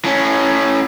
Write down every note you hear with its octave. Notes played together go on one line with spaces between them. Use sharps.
A2 C#4